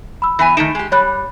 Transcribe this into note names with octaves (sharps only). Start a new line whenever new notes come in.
B5 E6
E3 B3 G#5
D#3 A3 D#4 D7 E7
G#3 G4
G3 C#5 B5 F#6